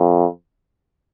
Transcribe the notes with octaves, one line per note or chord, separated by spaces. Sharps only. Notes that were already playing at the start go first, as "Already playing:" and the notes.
Already playing: F2